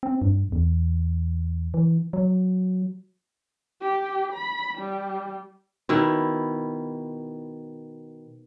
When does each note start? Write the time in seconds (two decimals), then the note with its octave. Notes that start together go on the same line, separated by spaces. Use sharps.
0.03 C4
0.22 G2
0.52 E2
1.74 E3
2.13 F#3
3.81 G4
4.33 B5
4.78 G3
5.89 B2 D#3 E4